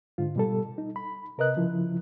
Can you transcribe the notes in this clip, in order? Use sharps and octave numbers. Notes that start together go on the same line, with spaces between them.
G#2 D3 F4
B2 G3 A4
D#4
B5
C3 A#4 B4 D#5 F#6
C#3 F3 E4